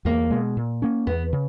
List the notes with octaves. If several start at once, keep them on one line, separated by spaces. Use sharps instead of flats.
E2 A#3
B2 G#3
A#2
A#3 C#4
E2 B3
C#3